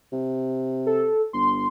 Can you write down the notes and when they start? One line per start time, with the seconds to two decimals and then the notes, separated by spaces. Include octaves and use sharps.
0.13 C3
0.86 A4
1.33 G1 C6